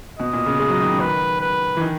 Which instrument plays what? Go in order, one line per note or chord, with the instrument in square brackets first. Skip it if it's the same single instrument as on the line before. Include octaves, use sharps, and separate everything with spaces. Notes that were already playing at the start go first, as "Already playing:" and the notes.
[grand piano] B2 [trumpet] D#5
[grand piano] A#2
C#3
G#3
F#3
D#3
C#3
[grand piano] D#3 [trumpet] B4
[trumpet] B4
[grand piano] E3
D#3